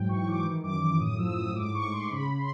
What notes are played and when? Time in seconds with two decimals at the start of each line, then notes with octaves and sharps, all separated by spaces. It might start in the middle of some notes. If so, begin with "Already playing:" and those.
Already playing: G#2 F#3 G5
0.08 E3 C#6
0.26 E3 D6
0.45 D#3
0.64 F#2 D6
0.81 F#2 D6
1.00 A2 D#6
1.19 F3 E6
1.37 A2 D#6
1.56 G#2 D6
1.74 G#2 C#6
1.93 G#2 C6
2.11 C#3 B5
2.38 C6